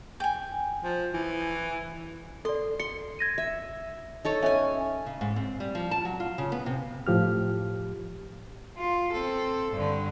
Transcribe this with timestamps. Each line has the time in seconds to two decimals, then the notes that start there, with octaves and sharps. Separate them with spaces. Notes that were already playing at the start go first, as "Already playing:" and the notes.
0.20 G5 G#5
0.84 F3
1.14 E3
2.45 A4 D5 C6
2.80 C6 C#7
3.19 G#6 A#6 D#7
3.38 E5
4.25 D#4 A4 C#5
4.43 C#4 C#5 E5 G#5
5.06 C#3
5.21 G#2
5.36 C4
5.60 G3
5.75 F3
5.91 A5
6.05 F#3
6.20 F4
6.38 C#3
6.52 B3
6.66 C3
7.07 A2 F3 G4 F6
8.78 F4
9.12 C4 A4
9.73 G2 D3